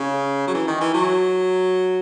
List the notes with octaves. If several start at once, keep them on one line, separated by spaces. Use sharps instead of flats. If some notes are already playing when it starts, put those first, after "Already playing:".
Already playing: C#3
F#3
E3
D#3
E3
F#3